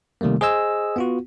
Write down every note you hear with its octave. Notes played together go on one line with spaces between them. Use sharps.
C3 D#3 G3 A3 A#3
G#4 C5 D#5 G#5 E6
B3 F4 F#4